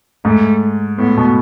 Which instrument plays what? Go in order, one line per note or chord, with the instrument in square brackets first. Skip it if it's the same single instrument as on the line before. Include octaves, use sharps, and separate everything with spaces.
[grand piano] G#2 [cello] A3
[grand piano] A2 [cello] B3
[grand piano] B2